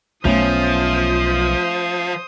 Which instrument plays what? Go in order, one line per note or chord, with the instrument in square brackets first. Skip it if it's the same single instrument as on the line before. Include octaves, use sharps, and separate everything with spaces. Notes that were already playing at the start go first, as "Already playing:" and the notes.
[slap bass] B1 B3 [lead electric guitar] F3 [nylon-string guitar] A3 C#4 [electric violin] C5 D#6